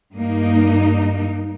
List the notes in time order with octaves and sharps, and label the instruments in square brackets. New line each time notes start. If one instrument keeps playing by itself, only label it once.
[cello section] G2 A#3 D#4